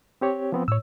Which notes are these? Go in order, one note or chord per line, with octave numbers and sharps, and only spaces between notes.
C4 G4 C#5
F3 B3 C4
A2 C#5 E6